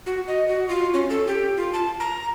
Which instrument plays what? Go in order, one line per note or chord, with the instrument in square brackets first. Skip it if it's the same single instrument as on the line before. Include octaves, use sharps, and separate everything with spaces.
[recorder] F#4
D#5
F#4
F4
C#4
A4
G4
F4
A5
A#5